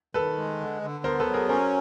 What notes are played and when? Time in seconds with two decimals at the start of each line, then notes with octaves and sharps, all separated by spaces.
0.14 D#3 A4 B4
0.37 G#3
0.60 D3
0.82 D3
1.04 B3 A#4 C5
1.20 A4 B4
1.26 F#3
1.34 G#4 A#4
1.49 C#4 A#4 C5